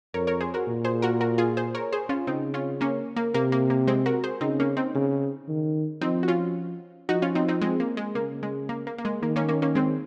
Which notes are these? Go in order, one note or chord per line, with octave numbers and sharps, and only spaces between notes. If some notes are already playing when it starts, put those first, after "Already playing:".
F2 A#4 C#5
A#4 C#5
G#4 C5
F#4 A#4
A#2
G#4 C5
F#4 A#4
F#4 A#4
F4 G#4
G#4 C5
A#4 C#5
G#4 C5
C#4 F4
C#3 C4 D#4
C#4 F4
A#3 C#4
A#3
C3 A#3
A#3
A#3
G#3 C4
F#4 A#4
G#4 C5
C#3 C4 D#4
A#3 C#4
C4 D#4
C#3
D#3
F3 C4 D#4
F#4
C#4 F4
F3 D#4 F#4
C#4 F4
C4 D#4
C4 D#4
G#3 C4
A#3
G#3
C#3 A#3
G#3
A#3
A#3
A#3
G#3
D#3 A#3
A#3 C#4
A#3 C#4
A#3 C#4
G#3 C4